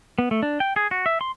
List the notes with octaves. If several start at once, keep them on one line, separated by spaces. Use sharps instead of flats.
B3
A3
D4
G5
G#4
F#4
E5
C6